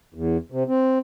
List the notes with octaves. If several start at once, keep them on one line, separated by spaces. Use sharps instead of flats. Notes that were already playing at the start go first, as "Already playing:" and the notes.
E2
C3
C4